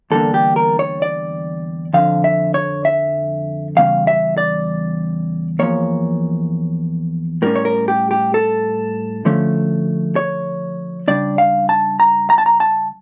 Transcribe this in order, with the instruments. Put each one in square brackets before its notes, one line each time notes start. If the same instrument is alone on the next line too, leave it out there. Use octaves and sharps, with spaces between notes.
[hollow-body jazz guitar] E2 D3 G3 A#3 D4 A4
G4
A#4
C#5
D5
F2 D3 F3 F5
E5
C#5
E5
E2 C#3 G3 C#4 F5
E5
D5
E2 D3 F3 A#3 C#5
A2 G3 C#4 A#4
C#5
A#4
G4
G4
A4
D3 F3 A3 C#4
C#5
C#3 G3 D4 D5
F5
A5
A#5
A#5
A5
A#5
A5